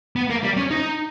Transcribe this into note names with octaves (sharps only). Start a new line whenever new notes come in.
B3
A#3
G3
C#4
D#4